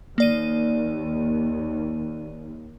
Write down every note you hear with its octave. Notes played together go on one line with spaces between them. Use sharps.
D#2 A#3 D5 D#7